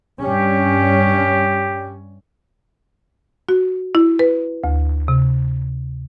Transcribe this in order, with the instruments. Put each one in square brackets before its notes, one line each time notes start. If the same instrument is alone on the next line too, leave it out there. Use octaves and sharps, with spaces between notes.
[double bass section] G2 G3 C#4 [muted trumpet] G4
[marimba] F#4
E4
B4
D2
C3